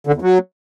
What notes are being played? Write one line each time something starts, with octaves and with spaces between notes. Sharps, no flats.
D3
E2
F#3